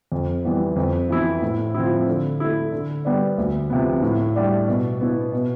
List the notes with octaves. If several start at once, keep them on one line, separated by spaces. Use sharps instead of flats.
F2
E3 G3 B3
F2
E3 B3 E4
A2
F3 C4 E4
D3
A3 E4
D3
G3 B3 D4
D2
C3 F3 B3
A2
G3 D4
B2
B3 E4
B2